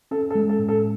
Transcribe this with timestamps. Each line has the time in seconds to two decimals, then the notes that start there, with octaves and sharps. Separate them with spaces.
0.11 C#4 A4
0.30 A4
0.35 G#3
0.49 A4
0.59 A2
0.69 A4